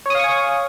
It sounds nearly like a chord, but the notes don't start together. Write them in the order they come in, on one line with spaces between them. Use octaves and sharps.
C#5 D#6 F5 C#6 G#5